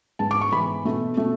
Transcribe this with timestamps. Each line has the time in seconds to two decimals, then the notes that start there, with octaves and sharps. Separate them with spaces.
0.19 G#2 G#3 B3 A5
0.31 D6
0.41 C#6
0.52 G#2 E3 G#3 B3 B5
0.85 B2 A3
1.17 B2 A3